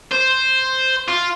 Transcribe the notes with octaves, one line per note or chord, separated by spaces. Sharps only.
C5
F4